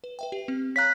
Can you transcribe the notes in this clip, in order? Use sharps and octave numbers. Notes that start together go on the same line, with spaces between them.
B4
B4 E5 G5
G4
C4
C#5 F5 A#5 F#6 B6